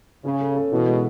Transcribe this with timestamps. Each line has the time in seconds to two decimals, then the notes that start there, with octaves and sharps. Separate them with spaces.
0.24 C#3 C#4
0.41 A4
0.56 A4
0.72 B2 E3
0.88 G#3